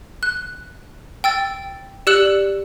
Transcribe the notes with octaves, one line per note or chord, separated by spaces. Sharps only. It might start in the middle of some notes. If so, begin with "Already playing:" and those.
F#6
G5 E6 A6
G4 D5 E6 F#6 C#7 F#7